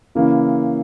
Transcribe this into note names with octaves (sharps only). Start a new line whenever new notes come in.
C#3 E3 A#3 C#4 E4